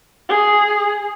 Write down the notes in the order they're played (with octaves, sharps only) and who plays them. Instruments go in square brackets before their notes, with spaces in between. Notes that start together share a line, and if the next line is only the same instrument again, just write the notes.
[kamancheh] G#4